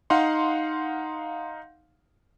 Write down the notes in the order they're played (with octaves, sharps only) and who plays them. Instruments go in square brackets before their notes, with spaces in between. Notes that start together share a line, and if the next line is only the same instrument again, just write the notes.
[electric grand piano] D#4 F5 F#5 C6